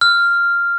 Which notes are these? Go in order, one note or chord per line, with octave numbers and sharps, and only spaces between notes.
F6